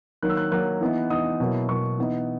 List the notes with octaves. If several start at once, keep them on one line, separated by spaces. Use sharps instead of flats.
D#3 F#3 A#3 F#6
E6
F#6
D#3 F#3 A#3 F#6
E3 B3 D#4
E3 B3 D#4 D#6
B2 F#3 A#3 E4
B2 F#3 A#3 E4 C#6
E3 B3 D#4